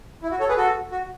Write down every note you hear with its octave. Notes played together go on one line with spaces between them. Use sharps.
E4
F#4
A4 C#5
G#4 B4
F#4 A4
F#4